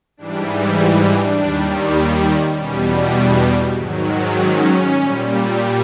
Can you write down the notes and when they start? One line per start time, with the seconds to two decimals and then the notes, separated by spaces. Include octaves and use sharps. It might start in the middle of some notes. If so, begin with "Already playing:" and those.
0.17 G#2 E3 G3 D4
0.76 D#4
1.07 D4
1.37 D#2 D#3 G3
2.55 E2 B2 G3 C#4
3.14 D4
3.74 G#2 D#3 F#3
4.33 C#4
4.93 A#2 G3